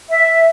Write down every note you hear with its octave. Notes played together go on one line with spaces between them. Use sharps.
E5